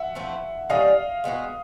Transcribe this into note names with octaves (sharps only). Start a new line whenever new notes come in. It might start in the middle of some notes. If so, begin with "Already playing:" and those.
Already playing: E5 F#5
F3 A3 C4 E4
E3 G3 A#3 C#4 D#5 F5
G#3 B3 D4 F#4